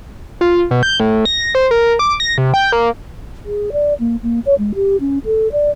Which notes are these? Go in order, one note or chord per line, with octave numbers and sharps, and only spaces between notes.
F4
B2
G6
A2
A#6
C5
A#4
D6
A#6
C3
G5
A#3
G#4
D5
A#3
A#3
C#5
G#3
G4
C#4
A4
D5